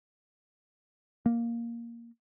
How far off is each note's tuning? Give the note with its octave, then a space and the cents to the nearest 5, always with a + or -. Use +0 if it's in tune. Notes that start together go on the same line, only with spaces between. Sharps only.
A#3 +5